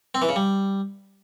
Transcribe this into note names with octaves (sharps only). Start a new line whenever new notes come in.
C4
E3
C#3
G3